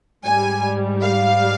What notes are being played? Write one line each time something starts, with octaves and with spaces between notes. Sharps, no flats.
G#2 G3 G#5
F5